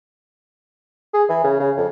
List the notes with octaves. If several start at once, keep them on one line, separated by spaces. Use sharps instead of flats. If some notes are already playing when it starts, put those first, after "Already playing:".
G#4
E3
C#3
C#3
F2